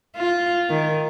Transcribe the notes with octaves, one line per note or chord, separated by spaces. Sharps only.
F4
D#3